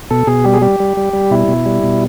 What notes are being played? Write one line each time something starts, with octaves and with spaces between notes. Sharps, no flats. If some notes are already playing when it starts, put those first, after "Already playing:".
B2 A4
B2 G#4
G3 G4
G#4
G3 G4
G3
G3
G3
B2 E4
B2
G3
B2